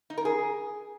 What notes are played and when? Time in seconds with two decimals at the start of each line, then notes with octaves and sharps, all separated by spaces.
0.10 D#4
0.18 A#4
0.25 G#4